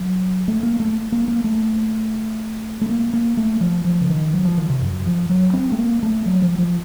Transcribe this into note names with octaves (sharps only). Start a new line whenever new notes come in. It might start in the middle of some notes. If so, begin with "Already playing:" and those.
Already playing: F#3
A3
A#3
A3
A#3
A#3
A3
A3
A#3
A#3
A3
F3
F3
C#3
D#3
F#3
F3
D#3
C3
F#2
F3
F#3
C4
A3
A#3
A3
F#3
F3
F3